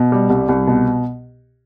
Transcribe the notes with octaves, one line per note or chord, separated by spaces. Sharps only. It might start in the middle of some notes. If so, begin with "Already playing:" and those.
Already playing: B2
G3
C2
C2
B2